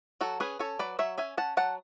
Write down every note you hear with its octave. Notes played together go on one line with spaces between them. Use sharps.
F#3 F#4 A4
C#4 G#4 B4
C#4 A4 C#5
F#3 B4 D5
F#3 C#5 E5
C#4 E5 G#5
C#4 F#5 A5
F#3 F#5 A5